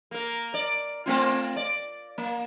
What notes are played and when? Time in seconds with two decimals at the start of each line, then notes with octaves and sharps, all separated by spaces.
0.11 A#3 A#4
0.54 D5
1.06 A3 C4 F4
1.56 D5
2.18 A#3